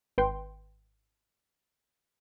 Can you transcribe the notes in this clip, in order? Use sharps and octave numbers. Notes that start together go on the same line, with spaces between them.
G#1 B4 G5 C6